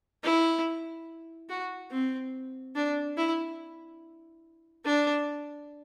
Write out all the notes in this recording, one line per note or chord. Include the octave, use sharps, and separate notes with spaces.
E4
F#4
C4
D4
E4
D4